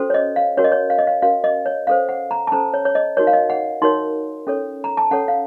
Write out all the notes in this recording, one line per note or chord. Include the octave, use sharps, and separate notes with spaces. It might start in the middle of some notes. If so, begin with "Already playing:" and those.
Already playing: C#4 F#4 A4 C5
C#5
D#5
F5
C#4 F#4 A#4 C#5
D#5
C#5
F5
D#5
F5
C#4 F#4 A#4 F5
D#5
C#5
C#4 A4 C5 F5
F#5
A#5
A5
C#4 A4 C5 A#5
C#5
C#5
D#5
D#4 F#4 A#4 C#5
F5
D#5
F#5
D#4 F#4 A#4 C#5 C6
C#4 A4 C#5
A#5
A5
C#4 A4 C#5 F#5
F5